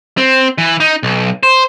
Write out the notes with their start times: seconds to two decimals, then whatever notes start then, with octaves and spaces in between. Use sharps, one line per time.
0.18 C4
0.58 E3
0.80 D#4
1.03 B1
1.43 C5